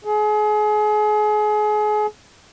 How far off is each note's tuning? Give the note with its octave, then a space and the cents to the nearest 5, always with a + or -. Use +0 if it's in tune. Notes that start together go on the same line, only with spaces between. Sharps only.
G#4 +30